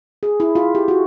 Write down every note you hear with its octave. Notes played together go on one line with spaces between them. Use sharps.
G#4
E4
F4
G4
F#4